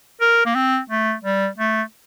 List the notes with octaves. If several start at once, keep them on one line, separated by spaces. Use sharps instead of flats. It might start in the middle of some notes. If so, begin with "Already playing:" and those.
A#4
A#3
C4
A3
G3
A3